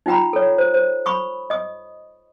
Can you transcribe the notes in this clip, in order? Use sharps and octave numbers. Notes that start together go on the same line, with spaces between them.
D#4 F4 G5 A#5 B5
A4 C#5
C5
C5
B5 C#6 D#6
D#5 D#6